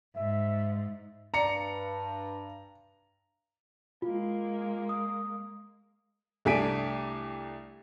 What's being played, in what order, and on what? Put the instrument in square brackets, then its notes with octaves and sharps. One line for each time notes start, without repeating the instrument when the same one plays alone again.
[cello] G#2 [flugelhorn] E5
[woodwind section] G2 [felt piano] D5 C#7 [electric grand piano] A#5
[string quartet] G#3 A#3 [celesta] F4
[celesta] D#6
[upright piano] C2 A3 D4 G#5 B6 D7